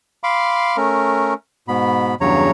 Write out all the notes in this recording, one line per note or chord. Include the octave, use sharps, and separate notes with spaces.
F5 B5 C6 D6
A3 C#4 A#4
G#2 B2 B3 B5
E2 G2 C#3 F#3 C#5 A#5